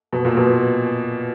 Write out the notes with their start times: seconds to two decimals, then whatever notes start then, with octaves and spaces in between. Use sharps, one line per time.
0.13 B2
0.25 A#2
0.37 B2